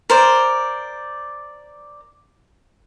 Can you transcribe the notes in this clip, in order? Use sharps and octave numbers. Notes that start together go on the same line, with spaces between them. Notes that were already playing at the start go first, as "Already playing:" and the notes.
A#4 C5 D5